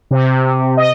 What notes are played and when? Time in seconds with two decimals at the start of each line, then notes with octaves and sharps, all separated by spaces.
0.11 C3
0.77 D#5